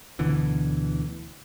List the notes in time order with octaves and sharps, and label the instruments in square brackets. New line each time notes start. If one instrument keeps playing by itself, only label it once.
[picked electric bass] D2 B2 D3 E3